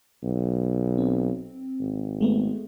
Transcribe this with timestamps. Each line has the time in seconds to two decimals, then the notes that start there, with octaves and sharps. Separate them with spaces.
0.24 B1
0.98 C4
1.80 G#1
2.21 G#3 A3 B3